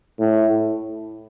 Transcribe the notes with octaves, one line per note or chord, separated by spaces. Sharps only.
A2